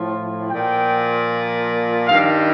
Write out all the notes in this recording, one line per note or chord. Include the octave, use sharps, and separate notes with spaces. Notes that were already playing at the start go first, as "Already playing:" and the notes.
Already playing: A2 F3
A#2 F3 G5
G2 D#3 F5